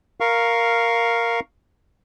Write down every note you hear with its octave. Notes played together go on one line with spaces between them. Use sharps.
A#4 F5 C#6